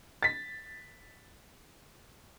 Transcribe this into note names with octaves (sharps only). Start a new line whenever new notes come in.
A6 B6